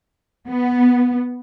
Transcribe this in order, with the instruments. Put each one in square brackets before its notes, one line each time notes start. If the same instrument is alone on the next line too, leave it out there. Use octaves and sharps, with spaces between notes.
[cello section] B3